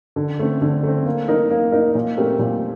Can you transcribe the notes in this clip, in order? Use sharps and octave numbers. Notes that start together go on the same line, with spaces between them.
D3
A3 C4
D3
A3 C4
A#3
D#4 A#4 D#5
A#3
D#4 A#4 D#5
A#2
A3 C4 G4 A#4
A#2